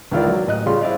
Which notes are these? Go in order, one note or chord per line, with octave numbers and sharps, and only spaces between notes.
C#2 D#3 E4 F4 A#4 D5
F#3
A1 D#5 F#6
C#3 G3 F4 C6
E4 C5 D5 D#5 F5